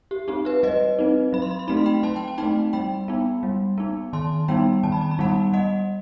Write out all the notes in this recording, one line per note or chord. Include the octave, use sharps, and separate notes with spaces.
G4
C4 D#4 G4
G4 B4
G3 B4 D#5
C4 D#4
F#3 B5
C6
B5
C6
A3 C4 D#4 B5
C6
G5 B5
F#3 A5 C6
G5
A5
A3 C4 D#4 G5 B5
G3 G5 B5
B3 D#4
G3
B3 D#4
D#3 A5 C6
G3 B3 D#4 G5 B5
D#3 A5
B5
A5
B5
G3 B3 D#4 F#5 A5
G3 D#5 F#5